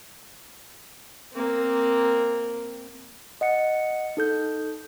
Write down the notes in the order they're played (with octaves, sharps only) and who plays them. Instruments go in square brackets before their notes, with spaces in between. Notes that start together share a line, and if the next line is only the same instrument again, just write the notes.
[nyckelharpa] A#3 C4
[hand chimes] D#5 F#5 C#7
D#4 A4 G6